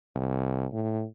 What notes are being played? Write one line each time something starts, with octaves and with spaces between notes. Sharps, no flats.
C2
A2